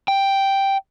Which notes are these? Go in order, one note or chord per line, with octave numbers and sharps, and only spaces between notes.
G5